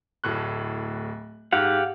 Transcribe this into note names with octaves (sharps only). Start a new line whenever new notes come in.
D1 A2 F#6
G#2 G4 F5 F#5